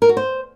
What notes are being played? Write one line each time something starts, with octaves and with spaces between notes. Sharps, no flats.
A#4
F#4
C5